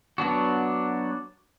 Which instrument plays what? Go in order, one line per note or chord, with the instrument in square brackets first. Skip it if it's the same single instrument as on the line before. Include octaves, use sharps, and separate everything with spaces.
[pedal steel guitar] F#3 B3 D4 F#4